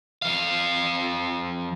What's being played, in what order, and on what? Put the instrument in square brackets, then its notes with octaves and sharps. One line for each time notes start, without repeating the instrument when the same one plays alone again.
[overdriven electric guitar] F2 F5